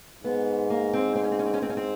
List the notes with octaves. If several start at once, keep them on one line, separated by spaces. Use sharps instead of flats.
G#2 B3
A#3
C4
C4
C#4
C4
C#4
C4
C#4
G#2 C4
C#4
C4